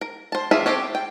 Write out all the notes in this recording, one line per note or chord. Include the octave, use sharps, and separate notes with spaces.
A#4
C5 A5
E3 F4 G#4 E5 B5
C4 F#4 G4 A4 C#5
G5